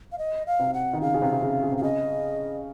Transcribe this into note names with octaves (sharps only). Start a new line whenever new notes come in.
F5
D#5
F5
C3
F#5
D#3
C#3 F5
C#3
C3
C3
C#3
C#3
C3
F5
C#3 D#5